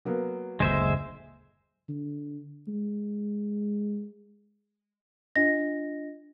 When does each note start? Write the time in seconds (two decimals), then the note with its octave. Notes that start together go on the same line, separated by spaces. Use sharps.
0.05 F#3 A#3 B3
0.60 F#1 D2 A#2 G#3 C5 E5
1.89 D3
2.68 G#3
5.36 D4 F4 D#5 A#6